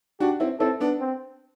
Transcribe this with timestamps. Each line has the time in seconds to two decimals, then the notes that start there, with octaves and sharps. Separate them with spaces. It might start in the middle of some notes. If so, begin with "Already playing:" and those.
0.20 D4 F#4 G4
0.40 C4 E4
0.60 C4 E4 A4
0.80 B3 D4
1.00 C4